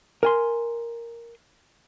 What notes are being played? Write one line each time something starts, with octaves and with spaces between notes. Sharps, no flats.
A#4 G#5 C6